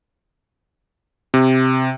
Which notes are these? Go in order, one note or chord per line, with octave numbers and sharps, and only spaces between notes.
C3